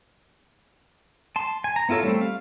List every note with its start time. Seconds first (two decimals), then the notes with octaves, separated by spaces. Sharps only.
1.36 A5 C6
1.64 G#5
1.76 A#5
1.89 B3 E4 F4 A4 C#5
2.03 G3 A3 C4
2.21 F5